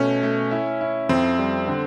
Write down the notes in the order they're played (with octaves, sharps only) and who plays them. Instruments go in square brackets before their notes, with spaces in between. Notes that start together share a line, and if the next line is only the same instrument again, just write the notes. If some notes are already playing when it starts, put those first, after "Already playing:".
Already playing: [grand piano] B2 A3 [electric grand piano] C#4
[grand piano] A3
E4
E4
[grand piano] F2 [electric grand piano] C4
[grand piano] G3
D3